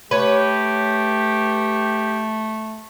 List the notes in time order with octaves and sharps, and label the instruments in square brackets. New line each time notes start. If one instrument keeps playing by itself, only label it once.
[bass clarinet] A3 [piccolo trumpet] G4 [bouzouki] B4 C#5